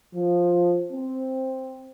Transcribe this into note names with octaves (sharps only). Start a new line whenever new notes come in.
F3
C4